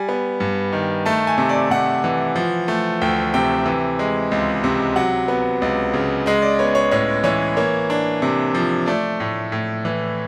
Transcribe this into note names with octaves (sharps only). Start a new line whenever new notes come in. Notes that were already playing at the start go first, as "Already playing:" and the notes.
Already playing: G3 G#5
B3
G2
D#3
A3 A5
G#5
C3
D5
C3 F#5
E3
F3
A3
D2 G5
C3 G5
E3
G#3
C#2
C3
F#3 F#5
B3
C#2
C#3
G#3 D#5
D5
B3 C#5
C#5
A2 C#5
E3 C#5
A#3 C#5
D4
C3
F3
A3 D5
A2
A2
E3